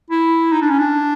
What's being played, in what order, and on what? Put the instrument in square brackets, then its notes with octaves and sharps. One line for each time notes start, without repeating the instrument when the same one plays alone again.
[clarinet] E4
D#4
D4
C#4
D4